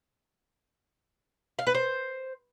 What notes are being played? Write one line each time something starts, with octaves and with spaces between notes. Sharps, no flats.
F5
B4
C5